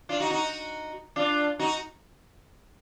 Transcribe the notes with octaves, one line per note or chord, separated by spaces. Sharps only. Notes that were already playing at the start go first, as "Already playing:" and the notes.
D4 F4
D#4 F#4
D#4 F#4
D4 F4
D#4 F#4